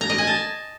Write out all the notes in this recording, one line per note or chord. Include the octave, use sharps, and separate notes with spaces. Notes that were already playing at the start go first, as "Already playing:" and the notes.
A#5
D#5
G#5
A5